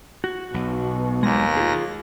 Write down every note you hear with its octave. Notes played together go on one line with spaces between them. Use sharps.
F#4
B1 B2
D#2 G#3 A#6
F4 G#4